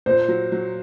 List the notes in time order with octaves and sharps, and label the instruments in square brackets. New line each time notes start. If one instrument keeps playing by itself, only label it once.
[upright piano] A#2 [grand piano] C5
[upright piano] F#3
F#3